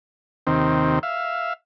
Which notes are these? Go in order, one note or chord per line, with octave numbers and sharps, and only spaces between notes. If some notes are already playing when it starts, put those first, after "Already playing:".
D#2 C3 D#3 C4
E5 F5